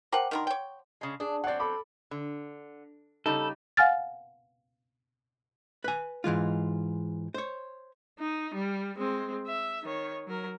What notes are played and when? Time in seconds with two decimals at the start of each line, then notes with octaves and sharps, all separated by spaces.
0.12 A#4 C5 F#5 G5 A5 D6
0.31 D#3 D4 A#4 F#5 C6
0.47 C#5 G5
1.01 C#3 G#3
1.20 D4 G#4
1.44 F#3 C4 D5 F#5
1.60 A4 B5 D6
2.11 D3
3.26 C#3 G3 D#4 A4
3.77 F5 F#5 G#5 F6 A6
5.84 B4 G#5
6.24 G#2 E3 G#3 F4
7.34 C5 C#5
8.19 D#4
8.54 G3
8.98 G#3 C4
9.47 E5
9.83 D#3 C#5
10.27 F#3 A#4